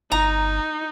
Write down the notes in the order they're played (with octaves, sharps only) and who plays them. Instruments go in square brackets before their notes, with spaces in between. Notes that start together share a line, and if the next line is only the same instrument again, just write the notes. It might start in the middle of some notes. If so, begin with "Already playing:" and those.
[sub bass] G1 [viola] D#4 [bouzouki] A#5